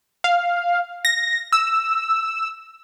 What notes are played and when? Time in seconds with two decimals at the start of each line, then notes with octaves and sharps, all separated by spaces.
0.24 F5
1.05 A#6
1.52 E6